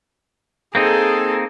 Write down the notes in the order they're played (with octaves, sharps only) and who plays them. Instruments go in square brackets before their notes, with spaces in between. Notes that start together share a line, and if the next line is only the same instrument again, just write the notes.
[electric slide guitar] A#3 C4 D#4 [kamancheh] G#4 A4